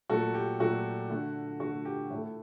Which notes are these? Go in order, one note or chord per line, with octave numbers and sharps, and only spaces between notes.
A#2 F#3 A3 F#4 A4
G4
A#2 F#3 A3 F#4
D3 A3
D3 A3 F#4
G4
A2 A3